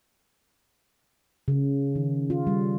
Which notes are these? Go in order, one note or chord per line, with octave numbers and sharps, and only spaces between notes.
C#3
D#3
F4
G3